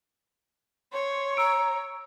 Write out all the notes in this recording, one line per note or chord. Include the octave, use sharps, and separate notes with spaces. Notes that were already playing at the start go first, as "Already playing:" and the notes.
C#5 C6
A#5 E6 D7